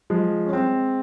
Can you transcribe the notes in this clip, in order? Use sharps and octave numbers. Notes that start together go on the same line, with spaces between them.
F3 G#3
C#4
G#3 C4